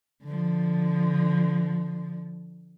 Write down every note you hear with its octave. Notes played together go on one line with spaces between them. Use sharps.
D3 F3